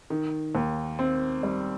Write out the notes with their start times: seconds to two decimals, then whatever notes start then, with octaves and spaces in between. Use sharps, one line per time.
0.10 D#3
0.55 D#2
0.99 C4
1.43 G3